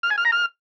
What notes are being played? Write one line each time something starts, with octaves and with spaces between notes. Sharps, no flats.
F6
G#5
F6
A#5
F6